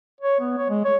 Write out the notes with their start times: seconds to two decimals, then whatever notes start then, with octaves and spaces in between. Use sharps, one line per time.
0.21 C#5
0.40 B3
0.58 C#5
0.69 G#3
0.85 C#5